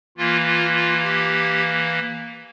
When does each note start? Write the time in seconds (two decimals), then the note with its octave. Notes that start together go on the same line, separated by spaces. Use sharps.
0.17 E3 A#3 F4
0.46 F4
0.74 F4
1.03 G4